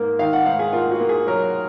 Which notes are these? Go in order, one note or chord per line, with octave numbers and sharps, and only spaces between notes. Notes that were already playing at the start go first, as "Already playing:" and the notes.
Already playing: G#2 A#3
D#3 F5
F#5
G#2 F5
G#4
A#3 F4
F#4
A#3
G#4
F#3 A#4